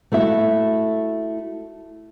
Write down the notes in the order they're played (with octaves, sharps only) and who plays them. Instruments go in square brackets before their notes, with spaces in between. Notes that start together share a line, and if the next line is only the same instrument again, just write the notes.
[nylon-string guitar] A3 E4 F#4 E5